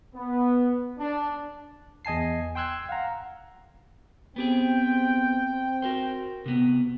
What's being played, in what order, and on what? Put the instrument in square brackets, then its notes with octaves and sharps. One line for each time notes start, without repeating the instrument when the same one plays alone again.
[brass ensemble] B3
D4
[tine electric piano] E2 D#5 G#5 A5 C7
G5 C6 E6 F#6 G#6
F5 F#5 A#5
[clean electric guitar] B3 G4 G#4 [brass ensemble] C4 G5
[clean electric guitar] F#4 A#4 C5
C3 B3